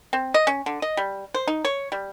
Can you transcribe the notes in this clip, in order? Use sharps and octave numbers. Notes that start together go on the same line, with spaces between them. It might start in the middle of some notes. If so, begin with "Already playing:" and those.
C4
D#5
C#4
D3
D#5
G3
C5
D#4
C#5
G3